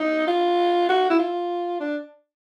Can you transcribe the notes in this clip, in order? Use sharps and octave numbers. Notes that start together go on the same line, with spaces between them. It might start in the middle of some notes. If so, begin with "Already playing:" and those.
Already playing: D#4
F4
F#4
E4
F4
D4